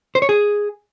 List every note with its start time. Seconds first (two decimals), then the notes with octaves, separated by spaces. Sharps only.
0.15 C5
0.22 C#5
0.29 G#4